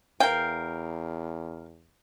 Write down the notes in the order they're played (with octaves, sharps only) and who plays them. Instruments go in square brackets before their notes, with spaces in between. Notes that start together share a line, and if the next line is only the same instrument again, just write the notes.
[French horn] E2 [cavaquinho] A#4 F5 [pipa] G5